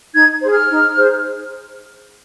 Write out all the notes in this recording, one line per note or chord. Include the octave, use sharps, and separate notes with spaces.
D#4 G#6
G#4 C5
F6
D#4
G#4 C5